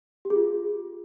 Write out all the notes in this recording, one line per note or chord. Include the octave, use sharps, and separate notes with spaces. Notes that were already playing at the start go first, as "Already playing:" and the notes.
G4
G#4
F4